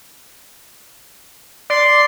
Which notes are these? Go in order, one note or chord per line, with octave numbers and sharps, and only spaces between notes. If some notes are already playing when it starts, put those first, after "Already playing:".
D5 C6